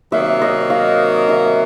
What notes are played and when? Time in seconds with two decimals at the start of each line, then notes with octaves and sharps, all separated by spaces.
0.12 C3 D#3 F#3 A#3 E5
0.42 D#5
0.70 F5
1.29 E5